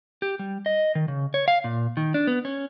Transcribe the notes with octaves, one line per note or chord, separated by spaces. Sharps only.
G4
G3
D#5
D#3
C#3
C#5
F5
A#2
D#3
D4
B3
C#4